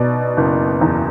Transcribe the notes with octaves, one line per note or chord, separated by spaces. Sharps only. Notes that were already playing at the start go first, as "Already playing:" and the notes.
Already playing: B2 D5
F#1
E2